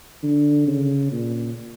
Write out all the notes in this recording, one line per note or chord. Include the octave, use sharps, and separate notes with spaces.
D3
C#3
A#2